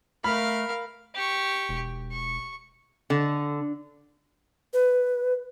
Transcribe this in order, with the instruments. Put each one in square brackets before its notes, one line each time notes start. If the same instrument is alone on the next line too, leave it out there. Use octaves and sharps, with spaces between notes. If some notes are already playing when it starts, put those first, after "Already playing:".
[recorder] A3 [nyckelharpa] A#4 F5 [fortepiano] B5
[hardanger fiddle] G4 C#6
[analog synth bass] E1
[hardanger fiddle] C#6
[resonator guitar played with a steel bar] D3
[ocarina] B4